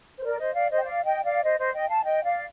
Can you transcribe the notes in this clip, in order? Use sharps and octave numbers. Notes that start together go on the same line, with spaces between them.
C5
A#4 D5
C5 D#5
D5 F5
C5 D#5
G5
D5 F5
D#5 G5
D5 F5
C5 D#5
C5 D#5
D#5 G5
F5 A5
D#5 G5
D5 F5